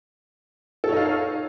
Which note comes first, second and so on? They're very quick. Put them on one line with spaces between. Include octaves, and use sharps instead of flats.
A4 C#5 D#4 F5